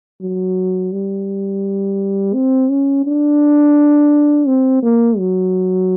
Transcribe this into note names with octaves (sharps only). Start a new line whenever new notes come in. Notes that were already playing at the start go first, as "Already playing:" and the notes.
F#3
G3
C4
C#4
D4
C4
A#3
F#3